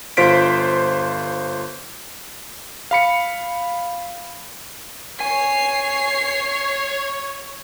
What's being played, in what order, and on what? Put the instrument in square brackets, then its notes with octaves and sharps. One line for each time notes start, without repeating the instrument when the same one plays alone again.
[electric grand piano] G1 F4 C5 B6 D7
F5 B5 C#7
[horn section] C#5 [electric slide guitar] G#5 [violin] C7